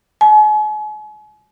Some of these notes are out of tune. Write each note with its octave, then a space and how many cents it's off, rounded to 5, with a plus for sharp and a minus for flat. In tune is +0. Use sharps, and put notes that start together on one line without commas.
G#5 +40